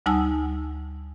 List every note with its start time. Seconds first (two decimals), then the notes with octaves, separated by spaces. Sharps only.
0.06 D2 G3 D#4 G#5 A5 E6